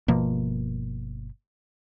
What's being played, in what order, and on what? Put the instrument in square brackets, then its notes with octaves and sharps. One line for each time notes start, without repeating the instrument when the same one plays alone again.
[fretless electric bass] G1 B2 F3 A#3